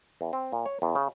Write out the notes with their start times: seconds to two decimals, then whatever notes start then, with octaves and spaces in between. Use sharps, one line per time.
0.21 E2
0.33 C4
0.53 A#2
0.66 C#5
0.82 E2
0.95 C#3